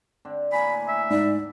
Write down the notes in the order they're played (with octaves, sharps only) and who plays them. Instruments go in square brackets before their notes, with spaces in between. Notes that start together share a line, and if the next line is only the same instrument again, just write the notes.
[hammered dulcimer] D3 C4 D4
[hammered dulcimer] A2 A#3 [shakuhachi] G#5 [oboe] B5
[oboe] E5
[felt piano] G#2 [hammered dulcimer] B3 [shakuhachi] D5